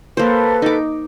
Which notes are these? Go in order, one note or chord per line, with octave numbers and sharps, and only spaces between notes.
A#3 A4 B4 C5
D#4 D6